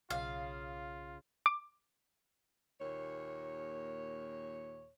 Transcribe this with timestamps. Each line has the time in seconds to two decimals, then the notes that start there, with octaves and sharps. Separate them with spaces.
0.10 B1 C#3 F4 F5
1.46 D6
2.81 D#2 A#2 C#5